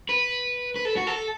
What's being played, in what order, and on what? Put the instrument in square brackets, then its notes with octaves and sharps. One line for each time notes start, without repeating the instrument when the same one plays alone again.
[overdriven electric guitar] B4
B4
A4
F#4
A4